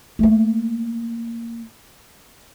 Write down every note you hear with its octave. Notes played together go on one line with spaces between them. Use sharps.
A3 A#3